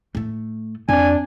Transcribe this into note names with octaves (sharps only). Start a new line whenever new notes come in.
A2 A3
F2 C4 D4 G#5